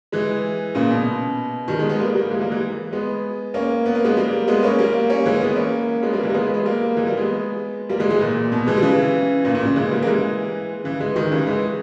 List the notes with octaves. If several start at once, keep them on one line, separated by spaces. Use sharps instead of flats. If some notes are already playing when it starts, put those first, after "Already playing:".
E3 G#3
A#2 C#3
B2
D#3 G3
G#3 B3
G#3 B3
G3 A#3
G3 A#3
E3 G#3
G3 A#3
E3 G#3
G#3 B3
A#3 C#4
B3
A#3
G#3 B3
G3 A#3
G#3 B3
A#3 C#4
G3 A#3
A#3 C#4
E3 G#3
G#3 B3
A#3 C#4
G#3 B3
G3 A#3
E3 G#3
A#3
G#3 B3
G#3
G3 A#3
E3 G#3
G3 A#3
G#3 B3
G3 A#3
E3 G#3
E3 G#3
A#2
B2
E3 G#3
G3
C#3 E3
A#2 C#3
A#2 C#3
A#2 C#3
E3 G#3
G3 A#3
A#3
E3 G#3
C#3 E3
E3 G#3
D#3 G3
C#3 E3
E3 G#3